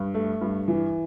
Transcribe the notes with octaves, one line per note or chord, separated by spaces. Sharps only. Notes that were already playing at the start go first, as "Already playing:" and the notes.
Already playing: G2
A3
G2
E3